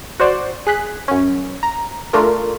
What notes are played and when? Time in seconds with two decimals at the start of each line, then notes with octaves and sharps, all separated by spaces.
0.19 F#4 C5 D5
0.67 G#4 F#6 B6
1.08 F#2 C#4
1.63 A#5
2.13 A3 D4 F4 A#4